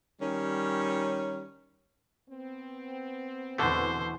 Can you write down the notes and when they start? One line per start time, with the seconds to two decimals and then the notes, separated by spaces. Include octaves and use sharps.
0.21 D#3 G3 C#4
2.29 B3 C4
3.58 E2 B2 D3 E3 A3 C5